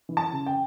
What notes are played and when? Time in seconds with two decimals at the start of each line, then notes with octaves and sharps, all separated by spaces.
0.09 E3
0.17 A5
0.32 C#3
0.46 G5